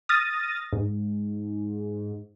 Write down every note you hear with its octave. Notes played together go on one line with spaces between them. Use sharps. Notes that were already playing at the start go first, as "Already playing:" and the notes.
D#6 F6 A6 A#6
G#2